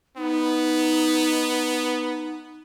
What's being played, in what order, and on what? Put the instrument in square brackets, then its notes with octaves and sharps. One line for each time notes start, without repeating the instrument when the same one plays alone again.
[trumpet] B3 [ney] D#4